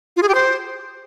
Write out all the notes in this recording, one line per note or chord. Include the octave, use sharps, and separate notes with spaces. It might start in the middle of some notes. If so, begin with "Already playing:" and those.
F4
G#4
G4
C5